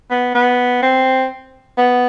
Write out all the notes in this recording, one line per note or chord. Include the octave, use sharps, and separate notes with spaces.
B3
B3
C4
B3